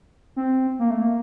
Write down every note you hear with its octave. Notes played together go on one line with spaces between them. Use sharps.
C4
A#3
A3
A#3